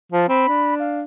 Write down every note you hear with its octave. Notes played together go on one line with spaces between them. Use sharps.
F3 A5
C4 B5
D4
F5